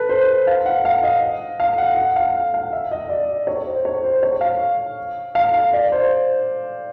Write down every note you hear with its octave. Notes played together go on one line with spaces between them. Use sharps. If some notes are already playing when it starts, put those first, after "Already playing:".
Already playing: A4 B4
C5
F5
F#5
F5
D#5
F5
F#5
F#5
F5
F#5
F5
E5
D#5
D5
C#5
C5
C#5
C5
C#5
F5
F5
F5
D5
C5